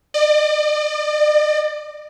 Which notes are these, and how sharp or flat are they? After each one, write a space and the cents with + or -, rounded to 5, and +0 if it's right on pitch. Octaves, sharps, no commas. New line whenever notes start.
D5 +40